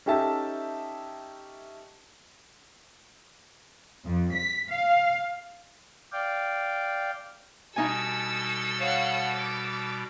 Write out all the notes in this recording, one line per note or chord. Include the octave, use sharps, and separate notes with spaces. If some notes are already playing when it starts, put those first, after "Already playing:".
C#4 D#4 G4 A4 E5 A5
F2
B6
F5
D5 F5 G5
B2 G3 D#4 A4 G#5 E6
C#5 F5 F#5
D6